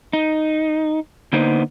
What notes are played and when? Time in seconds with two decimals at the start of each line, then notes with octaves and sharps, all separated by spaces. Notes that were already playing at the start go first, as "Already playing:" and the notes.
0.13 D#4
1.33 D3 A#3 B3 D#4 C5